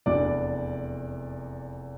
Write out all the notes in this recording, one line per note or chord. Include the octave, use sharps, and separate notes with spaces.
F1 E2 E3 D4 D5